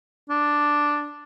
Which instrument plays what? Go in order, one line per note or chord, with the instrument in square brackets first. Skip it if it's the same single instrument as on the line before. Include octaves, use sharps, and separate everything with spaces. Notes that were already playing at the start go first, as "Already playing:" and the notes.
[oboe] D4